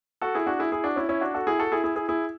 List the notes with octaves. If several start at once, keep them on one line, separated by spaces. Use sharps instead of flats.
F#4 A4
E4 G#4
D4 F#4
E4 G#4
E4 G#4
D4 F#4
C#4 E4
C#4 E4
D4 F#4
F#4 A4
E4 G#4
F#4 A4
E4 G#4
E4 G#4
E4 G#4
E4 G#4